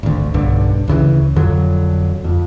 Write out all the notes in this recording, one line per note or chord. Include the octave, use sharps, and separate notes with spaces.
G#1 D2
B1 G2 D3
D2 C#3 E3
F2 D3 F#3
F2